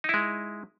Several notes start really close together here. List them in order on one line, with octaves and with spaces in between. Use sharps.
D#4 E4 G#3